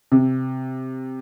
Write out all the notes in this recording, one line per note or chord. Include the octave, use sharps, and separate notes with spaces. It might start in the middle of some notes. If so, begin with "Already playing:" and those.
C3